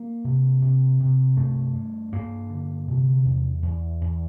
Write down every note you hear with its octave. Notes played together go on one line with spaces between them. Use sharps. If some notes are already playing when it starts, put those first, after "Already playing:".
Already playing: A#3
C3
C3
C3
G2 A3
G2
G2 A#3
D3
C3
E2
E2
E2